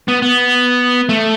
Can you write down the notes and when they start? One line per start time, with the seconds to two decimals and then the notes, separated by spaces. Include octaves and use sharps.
0.08 B3
0.22 B3
1.09 A3